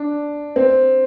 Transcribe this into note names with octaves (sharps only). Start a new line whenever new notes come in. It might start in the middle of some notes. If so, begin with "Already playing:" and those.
Already playing: D4
C4